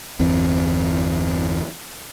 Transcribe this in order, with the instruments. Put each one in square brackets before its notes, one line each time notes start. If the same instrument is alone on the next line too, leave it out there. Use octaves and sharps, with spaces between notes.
[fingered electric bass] G1 E2 C4